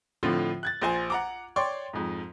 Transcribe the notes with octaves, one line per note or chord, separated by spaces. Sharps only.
A2 D3 F3 C4 F4
F#6 G#6 A6
A#1 C5 G#5
F#5 A#5 D6
C#5 D5 G5 C6 C#6
F2 G#2